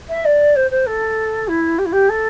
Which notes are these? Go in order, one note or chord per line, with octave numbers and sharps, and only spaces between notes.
E5
D5
C5
C5
A4
E4
G4
E4
G4
A4